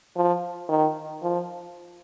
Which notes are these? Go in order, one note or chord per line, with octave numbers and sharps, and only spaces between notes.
F3
D#3
F3